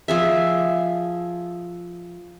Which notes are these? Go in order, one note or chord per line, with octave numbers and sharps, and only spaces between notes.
F3 G#4 E5